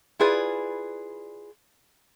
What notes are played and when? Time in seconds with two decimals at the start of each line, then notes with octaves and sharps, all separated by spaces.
0.20 E4 F4 G#4 B4 D5